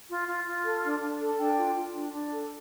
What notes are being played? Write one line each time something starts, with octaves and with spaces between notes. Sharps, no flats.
F4
F4
F4
A4
D4
D4
A4
D4 G5
F4
F4
D4
D4
A4